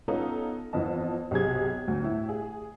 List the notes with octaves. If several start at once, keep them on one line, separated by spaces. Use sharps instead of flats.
B3 C#4 D#4 F4 A4
F2 E3 B3 D#5 A5
B1 C3 G#4 G#6
D2
A2 E4
G#4